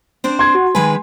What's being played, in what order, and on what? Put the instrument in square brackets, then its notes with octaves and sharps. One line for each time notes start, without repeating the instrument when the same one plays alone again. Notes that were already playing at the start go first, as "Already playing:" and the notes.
[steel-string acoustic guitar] C4 D4 C5
[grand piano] C6 G#6
[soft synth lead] F#4
[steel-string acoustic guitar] D#3 G#3 B4 [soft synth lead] G#5